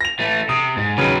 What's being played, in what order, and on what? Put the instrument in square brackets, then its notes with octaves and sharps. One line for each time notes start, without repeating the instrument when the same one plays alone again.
[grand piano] A#6 F7
[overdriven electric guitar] E3 A3
[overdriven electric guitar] C3 [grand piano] D#6
[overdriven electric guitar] G#2
[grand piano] D#2 C#3 [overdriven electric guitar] F#3 B4